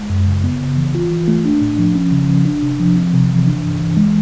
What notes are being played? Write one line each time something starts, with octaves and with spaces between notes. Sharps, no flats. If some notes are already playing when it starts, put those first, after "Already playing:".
Already playing: G#3
F#2
C#3
B3
C#3
E3
F4
E3
A3
D4
A2
F3
C#4
C#3
F3
D4
C3
F3
C4
C3
E3
D4
G2
E3
G#3